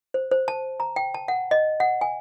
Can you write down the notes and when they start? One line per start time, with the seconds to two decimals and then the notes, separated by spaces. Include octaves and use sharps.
0.14 C5
0.31 C5
0.48 A5
0.80 A#5
0.96 G5
1.14 A5
1.28 F#5
1.51 D#5
1.80 F#5
2.01 G#5